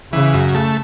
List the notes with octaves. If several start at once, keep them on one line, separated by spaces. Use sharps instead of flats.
C#3 E3
F#2
A3